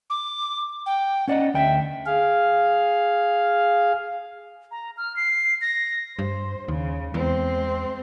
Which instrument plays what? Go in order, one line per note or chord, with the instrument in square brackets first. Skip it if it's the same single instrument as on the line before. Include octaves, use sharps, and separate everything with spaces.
[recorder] D6
G5
[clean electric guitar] C#4 D5 D#5 [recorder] F#5
[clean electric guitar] D2 G5 [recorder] E5
[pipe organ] G#4 F5
[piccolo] A#5
F6
C7
A#6
[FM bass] G2 [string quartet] C5
[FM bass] D#2 [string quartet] C#3
[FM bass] E2 [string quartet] G#3 C4 C6